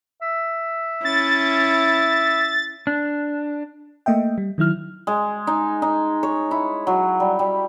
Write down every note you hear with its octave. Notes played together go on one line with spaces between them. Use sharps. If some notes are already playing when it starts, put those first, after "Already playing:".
E5
C#4 E4 A6
D4
A3 A#3 D#5 E5 G5
G3
D#3 F#3 E4 F6
G#3
D#4
D#4
C#5
E4
F#3
G3
G3